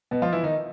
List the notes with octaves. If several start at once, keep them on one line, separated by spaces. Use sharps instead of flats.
B2 B3
F3 F4
E3 E4
D#3 D#4